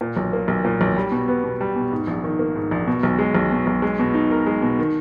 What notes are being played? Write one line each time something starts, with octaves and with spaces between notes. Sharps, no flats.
A#2
B1
A#3
B1
A#2
B1
G3
B2
B3
B2
G3
B2
G#2
A#1
D#3
A#3
G#2
A#1
B2
B1
G#3
B1
B2
B1
G#3
B2
D#4
A#4
G#3
B2
D#3